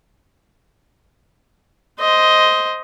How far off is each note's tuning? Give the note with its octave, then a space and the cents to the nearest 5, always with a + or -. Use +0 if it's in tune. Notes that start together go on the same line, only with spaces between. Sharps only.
C5 +0 D#5 +10